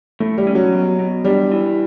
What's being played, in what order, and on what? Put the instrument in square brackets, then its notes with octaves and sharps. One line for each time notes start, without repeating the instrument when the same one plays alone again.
[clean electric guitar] A2 [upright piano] A3
[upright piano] G3
[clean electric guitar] C#4
[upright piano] F#3
[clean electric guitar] B2
B2
[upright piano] G3 [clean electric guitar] D4
[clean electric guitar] E3